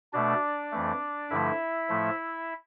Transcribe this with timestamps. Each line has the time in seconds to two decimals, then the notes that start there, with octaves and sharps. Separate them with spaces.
0.13 B2 A3 D4 D5
0.72 F2 E3 A3
1.30 G2 D3 F3 A3 E4 E5
1.89 A2 F3 A3